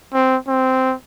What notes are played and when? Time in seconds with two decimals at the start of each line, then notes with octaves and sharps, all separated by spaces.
0.13 C4
0.48 C4